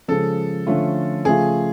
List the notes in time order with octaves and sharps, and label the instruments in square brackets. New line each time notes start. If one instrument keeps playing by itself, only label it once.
[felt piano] C#3 F3 G#3 [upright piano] A4
[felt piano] D3 F3 A3 C#4 F4
[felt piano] C#3 F3 A3 F4 [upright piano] G#4